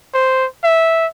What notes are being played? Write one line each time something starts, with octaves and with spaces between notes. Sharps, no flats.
C5
E5